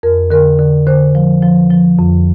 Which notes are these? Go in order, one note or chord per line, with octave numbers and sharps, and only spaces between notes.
F2 A#4
D3 A#4
D3
D3 C5
F3
F3
F3
F2